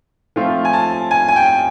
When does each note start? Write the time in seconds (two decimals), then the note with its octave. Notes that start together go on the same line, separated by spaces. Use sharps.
0.36 F3 A3 C4 F4
0.65 G#5
0.73 A5
1.11 G#5
1.28 G#5
1.36 G5